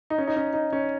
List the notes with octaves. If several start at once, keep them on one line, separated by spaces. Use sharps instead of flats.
D#4
C#4
D#4
C#4
D#4
C#4